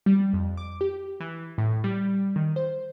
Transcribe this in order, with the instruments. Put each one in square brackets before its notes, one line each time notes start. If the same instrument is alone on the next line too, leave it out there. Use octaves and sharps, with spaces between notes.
[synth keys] G3
F2
D6
G4
E3
A2
G3
D#3
C5